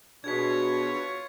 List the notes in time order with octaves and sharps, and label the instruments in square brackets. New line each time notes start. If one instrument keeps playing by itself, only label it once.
[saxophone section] B2 [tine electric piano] D4 G#4 D#5 [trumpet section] F4 C#5 [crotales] G#6 B6